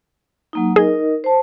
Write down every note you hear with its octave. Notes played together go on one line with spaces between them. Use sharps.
F#3 A#3 D#4
D#4 G#4 A#4 D#5
C5 A5